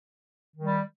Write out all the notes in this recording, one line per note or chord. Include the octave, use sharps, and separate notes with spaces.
D#3 G3